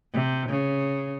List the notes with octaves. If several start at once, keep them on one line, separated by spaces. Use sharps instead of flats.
C3
C#3